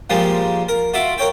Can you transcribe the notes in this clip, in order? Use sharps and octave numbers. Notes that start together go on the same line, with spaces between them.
A#2 F3 G3 G#3 A#3
A#4
F4 F#4 E5 D6
A#4 C#5 G5